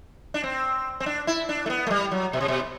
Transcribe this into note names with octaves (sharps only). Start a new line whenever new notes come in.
D4
C4
C4
D4
E4
D4
A3
B3
A3
G3
F#3
B2
C3
B2